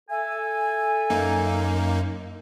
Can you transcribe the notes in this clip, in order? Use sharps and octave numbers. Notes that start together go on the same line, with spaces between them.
A4 E5 G#5
F#2 A#3 D#4